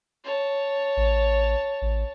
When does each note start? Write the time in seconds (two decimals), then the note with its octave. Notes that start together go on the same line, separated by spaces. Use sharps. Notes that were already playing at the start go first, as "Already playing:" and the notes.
0.24 C#5 A5
0.97 A1
1.82 A1